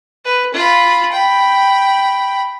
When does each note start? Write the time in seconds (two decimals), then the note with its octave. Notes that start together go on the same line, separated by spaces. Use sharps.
0.25 B4
0.54 F4 B5
1.12 G5 B5